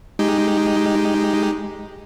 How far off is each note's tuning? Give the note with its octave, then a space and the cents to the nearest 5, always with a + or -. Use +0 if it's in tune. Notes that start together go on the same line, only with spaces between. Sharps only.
G#3 +0 D#4 +0 G4 +0